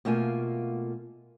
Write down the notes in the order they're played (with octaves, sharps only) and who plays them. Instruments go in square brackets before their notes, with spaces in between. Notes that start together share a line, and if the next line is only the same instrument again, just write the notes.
[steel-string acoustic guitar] B2 A3 A#3 F4 G#5